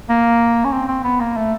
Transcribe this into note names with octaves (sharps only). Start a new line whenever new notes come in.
A#3
C#4
C4
C4
B3
A#3
A3